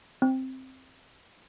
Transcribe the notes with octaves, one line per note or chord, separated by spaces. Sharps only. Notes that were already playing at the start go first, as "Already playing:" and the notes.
C4